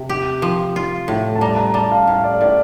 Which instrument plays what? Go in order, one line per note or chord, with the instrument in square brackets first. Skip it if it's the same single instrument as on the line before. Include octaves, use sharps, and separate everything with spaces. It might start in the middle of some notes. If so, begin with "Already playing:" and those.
Already playing: [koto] C3
G4
F3
F4
A2
[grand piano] A5
[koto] G3 [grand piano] A#5
[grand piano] A#5
[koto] G3 [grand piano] A5
[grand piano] F5
[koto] A2 [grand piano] F5
[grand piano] D5
[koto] A2 [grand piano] D5